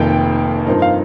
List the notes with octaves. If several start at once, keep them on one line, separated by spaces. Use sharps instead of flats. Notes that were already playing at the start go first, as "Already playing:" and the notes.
Already playing: F1 F2 D#3 A#3 G5
G2 F3 C4 D#4 A#4
F5